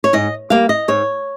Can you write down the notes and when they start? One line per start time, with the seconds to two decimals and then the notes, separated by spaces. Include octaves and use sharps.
0.04 C#5
0.13 G#2 D#5
0.50 G3 A#3 F5
0.69 D#5
0.88 G#2 C#5